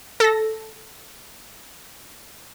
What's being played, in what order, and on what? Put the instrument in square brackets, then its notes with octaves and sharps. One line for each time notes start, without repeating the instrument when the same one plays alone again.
[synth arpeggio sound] A4 A#6